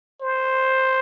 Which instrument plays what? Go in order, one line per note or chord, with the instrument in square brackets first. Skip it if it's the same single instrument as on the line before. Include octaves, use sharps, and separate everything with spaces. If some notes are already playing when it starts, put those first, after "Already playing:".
[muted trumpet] C5